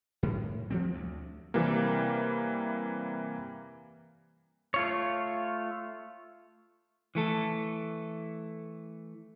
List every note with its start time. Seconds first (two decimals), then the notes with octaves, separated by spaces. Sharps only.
0.23 F#2 A2
0.70 F3 G3 C4
0.93 D2
1.54 C3 E3 G3 A#3
4.74 A3 F4 C#5
7.15 E3 A3 A4